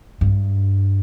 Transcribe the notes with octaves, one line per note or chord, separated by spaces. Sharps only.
G2